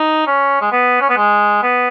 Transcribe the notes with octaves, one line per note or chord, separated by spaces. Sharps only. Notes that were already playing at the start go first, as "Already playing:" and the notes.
Already playing: D#4
C#4
G#3
B3
C#4
B3
G#3
B3